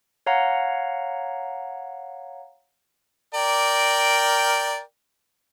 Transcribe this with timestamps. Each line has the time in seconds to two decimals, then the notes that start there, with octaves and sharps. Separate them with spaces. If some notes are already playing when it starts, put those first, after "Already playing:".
0.26 C#5 F5 F#5 A#5
3.34 A#4 D5 G5